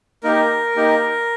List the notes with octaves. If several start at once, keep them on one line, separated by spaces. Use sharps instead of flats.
A#3 D#4 G4 A#4
A#3 D#4 G4